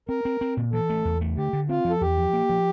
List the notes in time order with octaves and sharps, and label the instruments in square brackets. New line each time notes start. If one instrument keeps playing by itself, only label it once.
[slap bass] C4 [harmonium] A#4
[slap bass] C4
C4
A#2
[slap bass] E3 [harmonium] A4
[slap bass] A3
E2
A3
[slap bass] D3 [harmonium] G4
[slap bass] D3
[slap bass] C4 [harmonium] F4
[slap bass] F3
[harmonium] A4
[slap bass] E2 [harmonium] G4
[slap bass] F3
A#3
F3